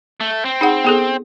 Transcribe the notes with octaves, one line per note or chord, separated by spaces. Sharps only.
A3
C4
D#4 G#4 F#5
B3 G#4 A4